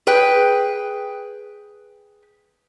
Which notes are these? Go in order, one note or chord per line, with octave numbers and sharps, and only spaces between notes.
G#4 B4 G5